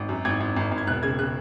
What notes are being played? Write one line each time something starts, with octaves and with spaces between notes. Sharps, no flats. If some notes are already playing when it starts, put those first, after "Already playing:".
Already playing: G#1
F#2
G#1 G#6
G#1
G#1
G#1
G#6
E1 F#6
C#3 G#6
C#3 F#6